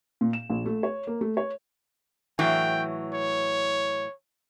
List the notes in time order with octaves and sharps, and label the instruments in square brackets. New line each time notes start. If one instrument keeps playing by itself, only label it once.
[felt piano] A#2
E7
A#1
A3
C#5
A#3
A3
C#5
[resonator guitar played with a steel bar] A2 E3 F#3 [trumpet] G5
[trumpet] C#5